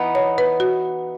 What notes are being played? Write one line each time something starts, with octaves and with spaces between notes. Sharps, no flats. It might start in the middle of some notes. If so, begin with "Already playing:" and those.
Already playing: E3 B3 D#4
C#5
B4
F#4